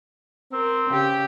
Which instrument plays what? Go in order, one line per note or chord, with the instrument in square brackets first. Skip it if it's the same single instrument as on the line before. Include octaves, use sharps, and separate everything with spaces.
[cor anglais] C4 [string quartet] A#4
[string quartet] C#3 G4